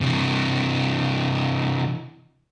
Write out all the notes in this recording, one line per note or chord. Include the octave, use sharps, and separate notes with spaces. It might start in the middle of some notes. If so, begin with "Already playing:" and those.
C3 E3